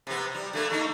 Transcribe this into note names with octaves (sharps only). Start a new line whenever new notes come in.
C3 B3
G3
D3 A3 A#3
A3 A#3 D#4